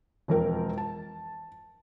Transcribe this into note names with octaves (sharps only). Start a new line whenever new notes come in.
E1 F2 A#4 G5
A5